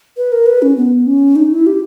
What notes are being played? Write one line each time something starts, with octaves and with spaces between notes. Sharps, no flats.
B4
A#4
B4
C#4
B3
C#4
D#4
E4
G4